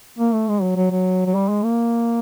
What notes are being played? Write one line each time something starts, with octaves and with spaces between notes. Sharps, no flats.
A#3
A3
G#3
F#3
F#3
F#3
F#3
G3
G#3
A#3